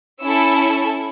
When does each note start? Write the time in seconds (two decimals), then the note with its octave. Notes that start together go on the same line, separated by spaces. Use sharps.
0.23 C#4 E4 A4 E6